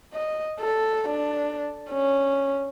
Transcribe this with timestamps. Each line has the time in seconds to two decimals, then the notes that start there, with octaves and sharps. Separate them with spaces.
0.14 D#5
0.60 A4
1.09 D4
1.90 C#4